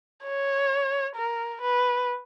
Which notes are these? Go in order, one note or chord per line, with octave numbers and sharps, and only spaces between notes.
C#5
A#4
B4